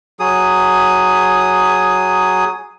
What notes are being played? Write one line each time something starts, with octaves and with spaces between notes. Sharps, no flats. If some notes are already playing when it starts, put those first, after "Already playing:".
F#3 G#4 D#6